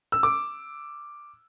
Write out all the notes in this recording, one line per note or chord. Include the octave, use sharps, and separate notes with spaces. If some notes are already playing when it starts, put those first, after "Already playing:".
E6
D6